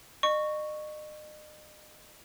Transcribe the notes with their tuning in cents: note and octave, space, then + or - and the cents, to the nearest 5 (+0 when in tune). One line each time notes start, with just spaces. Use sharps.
D#5 -40 C#6 +0